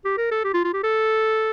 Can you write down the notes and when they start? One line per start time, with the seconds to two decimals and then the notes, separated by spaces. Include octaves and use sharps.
0.05 G4
0.17 A#4
0.31 A4
0.44 G4
0.54 F4
0.64 F4
0.73 G4
0.83 A4